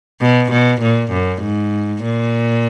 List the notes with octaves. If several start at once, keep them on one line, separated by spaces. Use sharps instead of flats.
B2
B2
A#2
F#2
G#2
A#2